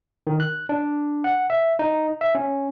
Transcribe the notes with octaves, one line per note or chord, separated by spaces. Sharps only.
D#3
F#6
D4
F#5
E5
D#4
E5
C#4